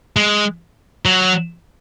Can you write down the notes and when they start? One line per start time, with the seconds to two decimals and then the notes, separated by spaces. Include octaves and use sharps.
0.16 G#3
1.05 F#3